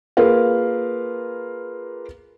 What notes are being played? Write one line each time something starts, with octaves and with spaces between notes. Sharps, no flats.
A#3 F4 G#4 A#4 B4 F5